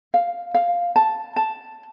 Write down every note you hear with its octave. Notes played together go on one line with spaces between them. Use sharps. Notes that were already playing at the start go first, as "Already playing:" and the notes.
F5
F5
A5
A5